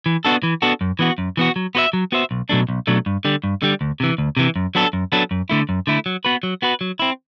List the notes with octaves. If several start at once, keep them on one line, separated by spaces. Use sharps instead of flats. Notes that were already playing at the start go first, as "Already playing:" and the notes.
E3
B3 D4 F#4 A4
E3
B3 D4 F#4 A4
F#2
E3 B3 F#4
F#2
E3 B3 F#4
F#3
B3 F#4 C5 E5
F#3
B3 F#4 C5 E5
B1
B2 F#3 A3 D4
B1
B2 F#3 A3 D4
G2
D3 G3
G2
D3 G3
D2
C3 E3
D2
C3 E3
F#2
F#3 B3 D4 A4
F#2
F#3 B3 D4 A4
F#2
D3 A3 E4
F#2
D3 A3 E4
F#3
B3 F#4 B4
F#3
B3 F#4 B4
F#3
C4 E4